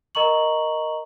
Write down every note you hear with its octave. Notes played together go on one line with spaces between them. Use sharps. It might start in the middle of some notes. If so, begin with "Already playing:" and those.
A#4 D#5 A#5 C#6 F#7